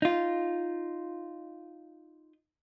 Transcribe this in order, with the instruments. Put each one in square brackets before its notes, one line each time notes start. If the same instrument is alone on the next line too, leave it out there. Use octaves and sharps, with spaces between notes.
[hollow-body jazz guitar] D#4 F4